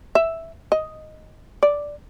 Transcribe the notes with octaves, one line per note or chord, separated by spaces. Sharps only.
E5
D#5
D5